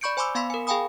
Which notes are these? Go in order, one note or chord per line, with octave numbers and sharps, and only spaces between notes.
D5 B5 C#6 G6 C#7 D7
C5 G#5 B5 C6 D6 E6
B3 F5 B5 C6 B6
A#4 G#5
G#4 F5 G5 G#5 B5 D#6